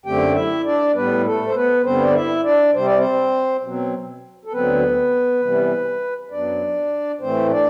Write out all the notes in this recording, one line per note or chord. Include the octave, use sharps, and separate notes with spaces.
F#2 D3 A3 C4 G4 G5
E4 E5
D4 D5
A2 G3 B3 B4
A3 A4
C5
B3 B4
G2 D3 G3 B3 C4 C5
D5
E4 E5
D4 D5
C3 G3 C4 C5
D5
C4 C5
B2 F#3 C4
A4
D2 D3 F#3 B3 C4 B4
C3 E3 G3 B3
F#2 F#3 B3 D4 D5
A2 E3 A3 C4 C5
D4 D5